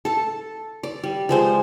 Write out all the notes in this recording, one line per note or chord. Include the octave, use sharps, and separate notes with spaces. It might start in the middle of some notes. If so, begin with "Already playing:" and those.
A4 A5
D5
G3
F3 G#3 C5